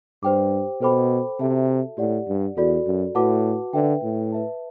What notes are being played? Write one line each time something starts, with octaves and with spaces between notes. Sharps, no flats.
G2 G4 C5 G5 D6
B2 A4 C5 G5 B5 D6
C3 F#4 A4 E5 A5
A2 G4 D5 F#5
G2
E2 F#4 A4 D5
F#2
A2 F#4 B4 F#5 A5 D6
D3 B4 E5 G5
A2
B4 E5 A5